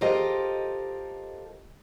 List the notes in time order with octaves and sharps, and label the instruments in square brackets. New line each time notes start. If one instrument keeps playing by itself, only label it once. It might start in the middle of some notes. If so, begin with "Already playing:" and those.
[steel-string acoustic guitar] F4 G4 A4 A#4 C5 D#5